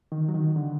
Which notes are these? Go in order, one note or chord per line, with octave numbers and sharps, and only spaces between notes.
D#3
F#3
D#3
D3